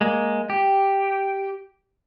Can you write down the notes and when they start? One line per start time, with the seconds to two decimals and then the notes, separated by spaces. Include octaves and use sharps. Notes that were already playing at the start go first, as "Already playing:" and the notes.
0.01 G#3 A#3
0.50 G4